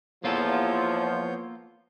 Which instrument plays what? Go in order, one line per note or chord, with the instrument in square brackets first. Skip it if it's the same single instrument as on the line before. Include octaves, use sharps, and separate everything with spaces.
[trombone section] E2 F3 [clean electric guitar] A#3 F4 A4 [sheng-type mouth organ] B3 C#5 G6